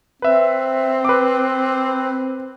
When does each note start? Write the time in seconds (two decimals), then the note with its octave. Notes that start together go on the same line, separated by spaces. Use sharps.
0.22 C4 B4 E5
1.05 B4 D6